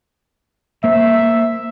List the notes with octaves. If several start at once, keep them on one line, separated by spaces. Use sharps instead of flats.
A#3 C5 E5